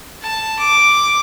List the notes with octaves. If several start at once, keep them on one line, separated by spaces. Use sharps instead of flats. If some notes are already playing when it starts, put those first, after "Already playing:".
A5
D6